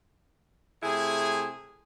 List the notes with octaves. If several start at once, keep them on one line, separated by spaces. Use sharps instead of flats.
C3 A3 E4 G#4